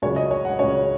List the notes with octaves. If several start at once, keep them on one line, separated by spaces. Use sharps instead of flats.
C#2 C#3 F#3 C#4 C#5
D#5
C#5
F#5
C#2 C#3 F#3 C#4 C#5